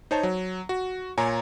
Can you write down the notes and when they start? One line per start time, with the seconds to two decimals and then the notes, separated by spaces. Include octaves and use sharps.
0.11 D#4 C5 C#5 A5
0.23 F#3
0.69 F#4
1.18 A#2 C#5 G#5 A#5